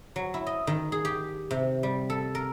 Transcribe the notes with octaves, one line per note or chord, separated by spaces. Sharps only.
F#3
E4
D#5
D#3
G#4
G4
C3
G3
A4
A#4